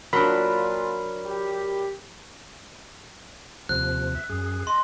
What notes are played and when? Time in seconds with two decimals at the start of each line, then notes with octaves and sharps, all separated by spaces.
0.13 A#2 F#3 D4 F4 A#4 B5
1.26 G4
3.69 D#2 C3 F3 F#6
4.15 E5
4.30 F#2 G#4
4.67 D#5 C6